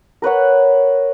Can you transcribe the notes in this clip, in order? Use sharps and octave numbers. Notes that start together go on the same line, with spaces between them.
A#4 B4 C#5 F#5